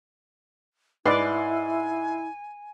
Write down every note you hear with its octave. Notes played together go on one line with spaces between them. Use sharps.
G#2 E4 B4 D5 G#5